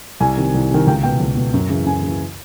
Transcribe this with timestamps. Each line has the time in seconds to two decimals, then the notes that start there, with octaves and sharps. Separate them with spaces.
0.20 C2 G#5
0.37 C3 D#3
0.54 C2
0.71 C3 D#3
0.87 C#2 G5
1.03 B2 G5
1.20 C#2
1.37 B2
1.54 F#2
1.70 C#3 E3
1.86 F#2 G#5
2.03 C#3 E3